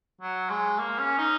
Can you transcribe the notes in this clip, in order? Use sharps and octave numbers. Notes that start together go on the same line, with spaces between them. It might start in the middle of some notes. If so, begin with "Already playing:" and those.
F#3
G#3
A#3
C#4
D#4